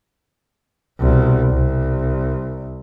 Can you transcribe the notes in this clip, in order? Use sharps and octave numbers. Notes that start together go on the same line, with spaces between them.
C2 B2
C2